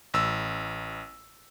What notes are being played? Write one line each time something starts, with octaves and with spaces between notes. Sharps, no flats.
A1 E6